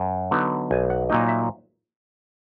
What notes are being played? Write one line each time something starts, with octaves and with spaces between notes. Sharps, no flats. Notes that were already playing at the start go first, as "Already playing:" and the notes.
Already playing: F#2
D3 F#3 B3 D#4
B1 G#5
F#5
A#2 F#3 A#3 D#4 D#5
E5